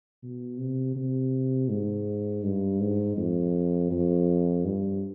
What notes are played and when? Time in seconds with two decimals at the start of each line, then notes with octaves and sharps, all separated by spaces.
0.23 B2
0.59 C3
0.95 C3
1.70 G#2
2.43 G2
2.80 G#2
3.17 F2
3.91 F2
4.65 G2